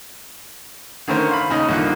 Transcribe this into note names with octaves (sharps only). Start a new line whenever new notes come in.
D3 D#3 A3 C#4 A#4 C5
F5 B5
D#2 C#3 C#4 D#4 D#5
C2 D3 D#3 A#3 F4 F#6